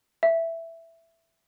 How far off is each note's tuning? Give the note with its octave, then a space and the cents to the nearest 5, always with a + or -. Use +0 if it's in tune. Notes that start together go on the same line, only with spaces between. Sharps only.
E5 +5